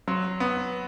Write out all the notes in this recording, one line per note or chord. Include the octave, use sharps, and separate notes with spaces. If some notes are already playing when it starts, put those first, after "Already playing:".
F#3 C6
B3